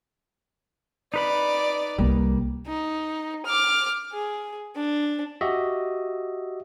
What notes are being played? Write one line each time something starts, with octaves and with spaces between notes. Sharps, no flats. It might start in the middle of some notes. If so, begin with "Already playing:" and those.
D#4 B4 D5 B5
C2 G3 A#3
D#4
D6 F6
G#4
D4
F#4 G4 D#5 E5